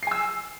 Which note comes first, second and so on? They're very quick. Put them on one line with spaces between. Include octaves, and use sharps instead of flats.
C7 G#5 E6